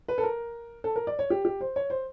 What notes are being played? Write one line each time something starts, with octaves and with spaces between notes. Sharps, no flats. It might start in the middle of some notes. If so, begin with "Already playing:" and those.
B4
A4
A#4
A4
A#4
D5
C#5
G4
G4
C5
C#5
C5